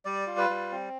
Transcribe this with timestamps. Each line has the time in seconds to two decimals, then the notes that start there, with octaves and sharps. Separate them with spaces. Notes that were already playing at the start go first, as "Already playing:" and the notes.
0.05 G3 D5
0.27 F4
0.37 B4
0.49 G3
0.71 C4